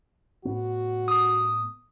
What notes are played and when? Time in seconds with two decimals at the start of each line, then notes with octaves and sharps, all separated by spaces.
0.45 A2 B3 F#4
1.08 D#6